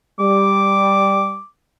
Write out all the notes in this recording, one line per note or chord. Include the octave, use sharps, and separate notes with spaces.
G3 D6